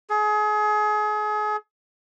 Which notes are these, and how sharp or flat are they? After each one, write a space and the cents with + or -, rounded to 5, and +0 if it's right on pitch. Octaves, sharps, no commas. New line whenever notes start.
G#4 +30